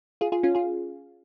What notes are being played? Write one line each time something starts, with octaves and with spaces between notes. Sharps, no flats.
F4 G#4
F4 G#4
C#4 F4
F4 G#4